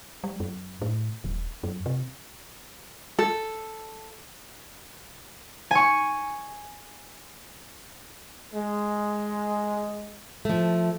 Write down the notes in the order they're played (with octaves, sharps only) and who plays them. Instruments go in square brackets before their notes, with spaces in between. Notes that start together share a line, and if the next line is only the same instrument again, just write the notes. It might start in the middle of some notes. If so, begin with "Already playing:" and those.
[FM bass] G3
F#2
A2
D#1
F#2
C3
[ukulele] A4
[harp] G#5 C#6
[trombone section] G#3
[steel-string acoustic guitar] F3 A3